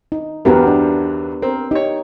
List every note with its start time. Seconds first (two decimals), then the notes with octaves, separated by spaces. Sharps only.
0.12 D#4
0.45 E2 G2 F#3 B3 G4 A#4
0.67 D4
1.42 C4 A#4
1.71 D#4 G4 C#5